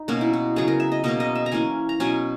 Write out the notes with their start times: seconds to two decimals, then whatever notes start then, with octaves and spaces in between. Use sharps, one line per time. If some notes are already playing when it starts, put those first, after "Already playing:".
Already playing: D#4
0.08 B2 A#3 C#4 F#4
0.21 E4
0.33 F#4
0.56 C#3 F#3 B3 G#4
0.68 A#4
0.80 E5
0.92 D#5
1.04 B2 A#3 C#4 D#5
1.20 D#5
1.35 E5
1.46 A#5
1.52 E3 A#3 C#4 G#5
1.89 A#5
2.00 B2 F#3 C#4 G#5